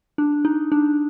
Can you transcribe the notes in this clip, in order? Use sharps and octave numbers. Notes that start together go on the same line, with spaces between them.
D4
D#4
D4